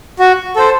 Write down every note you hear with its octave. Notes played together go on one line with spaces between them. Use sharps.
F#4
A4 C5